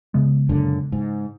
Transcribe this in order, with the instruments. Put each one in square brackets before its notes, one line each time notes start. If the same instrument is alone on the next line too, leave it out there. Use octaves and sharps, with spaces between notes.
[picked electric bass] C#3 G#3 B3
[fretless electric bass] F#2 A#2 D3
G#2